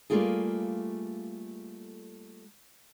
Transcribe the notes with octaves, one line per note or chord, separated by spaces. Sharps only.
G3 A3 A#3 F4 G#4